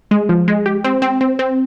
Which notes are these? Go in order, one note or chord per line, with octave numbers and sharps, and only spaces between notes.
G#3
F3
G#3
G4
C4
C4
C4
C4